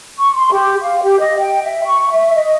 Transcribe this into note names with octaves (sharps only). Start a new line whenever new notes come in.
C#6
C6
G4
F5
G4
D#5
G5
E5
C#6
E5
D#5